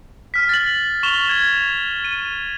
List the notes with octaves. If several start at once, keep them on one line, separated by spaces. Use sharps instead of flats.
F6 B6
A6 F#7
C#6 E7 F7 G7
G#6
D#7